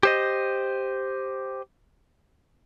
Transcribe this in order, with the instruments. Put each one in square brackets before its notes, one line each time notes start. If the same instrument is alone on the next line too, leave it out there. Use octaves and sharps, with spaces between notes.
[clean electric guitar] G4 C5 D#5